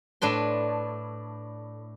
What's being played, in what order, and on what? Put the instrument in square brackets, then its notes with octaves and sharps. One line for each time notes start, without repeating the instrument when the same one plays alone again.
[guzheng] A2 D4 B4 C6